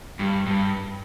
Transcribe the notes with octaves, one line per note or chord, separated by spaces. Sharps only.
G2
G2